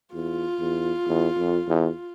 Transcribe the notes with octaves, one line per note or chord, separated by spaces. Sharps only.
E2 F4
E2
E2
F2
E2